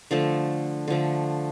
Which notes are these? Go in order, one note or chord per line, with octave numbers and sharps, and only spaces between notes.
D3 F3 A3
D3 F3 A3